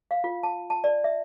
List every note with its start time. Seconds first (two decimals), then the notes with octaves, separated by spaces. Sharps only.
0.11 F5
0.24 F4
0.43 A5
0.70 A5
0.84 D5
1.04 E5